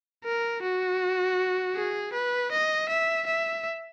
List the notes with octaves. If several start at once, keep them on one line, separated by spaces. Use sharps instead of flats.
A#4
F#4
G#4
B4
D#5
E5
E5